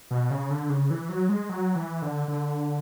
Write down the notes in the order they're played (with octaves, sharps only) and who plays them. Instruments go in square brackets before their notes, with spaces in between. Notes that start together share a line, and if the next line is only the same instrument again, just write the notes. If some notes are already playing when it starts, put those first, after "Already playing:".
[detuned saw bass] B2
C#3
D3
C#3
E3
F#3
G#3
F#3
E3
D3
D3